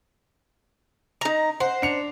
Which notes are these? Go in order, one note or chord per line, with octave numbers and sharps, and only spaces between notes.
D#4 A#5
C5 F#5
D4 C#7 F7